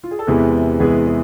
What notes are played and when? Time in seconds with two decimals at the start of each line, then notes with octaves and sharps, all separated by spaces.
0.04 F4
0.11 G#4
0.19 A4
0.27 E2 C3 E3 G#3 B3 G#4 B4
0.80 E2 C3 E3 G#3 B3 G#4
1.07 G#4